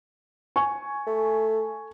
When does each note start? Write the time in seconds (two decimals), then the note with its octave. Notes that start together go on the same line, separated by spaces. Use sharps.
0.56 G#5 C#6
1.07 A3